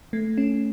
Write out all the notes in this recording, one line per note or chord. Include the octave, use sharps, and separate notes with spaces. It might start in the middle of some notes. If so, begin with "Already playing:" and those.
A3
C#4